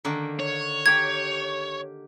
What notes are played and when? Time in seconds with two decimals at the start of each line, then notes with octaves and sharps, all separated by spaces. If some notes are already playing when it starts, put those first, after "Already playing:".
0.05 D3 D#3 A#3
0.39 C#5
0.86 A#3 G4 G#6